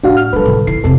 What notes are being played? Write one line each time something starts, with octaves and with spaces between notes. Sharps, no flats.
A2 D4 F#4 F5
F6
F3 G3 A4 B4
A2 D3
E4 C7
F1 C3 A4